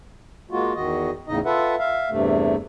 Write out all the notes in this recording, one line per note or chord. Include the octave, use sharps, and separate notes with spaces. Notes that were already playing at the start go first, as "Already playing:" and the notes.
G#3 A#3 F4 F#4
E2 D#3 F#4 D#5
E2 A2 C#3 D#4 D#5
F4 A4 B4 E5 F#5
E5 F5
E2 G2 C3 A3